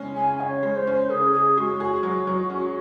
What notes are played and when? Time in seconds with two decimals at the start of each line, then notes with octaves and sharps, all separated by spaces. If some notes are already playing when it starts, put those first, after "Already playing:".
Already playing: C#3 G#3 C#4
0.16 C#3 G#5
0.40 C#3 C#5
0.63 G#3
0.76 C5
0.87 C#4
1.10 C#3 G#4
1.33 C#3 G#4
1.57 G#3 F#4
1.80 G#4
2.03 F#3
2.27 F#3
2.50 C#4